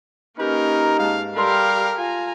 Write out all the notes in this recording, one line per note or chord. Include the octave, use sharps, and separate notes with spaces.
A#3 C#4 D#4 G4 A#4 B4
G#2 F5 A5
G3 G4 A4 A#4 E5 F5 C6
F4 G#5 A#5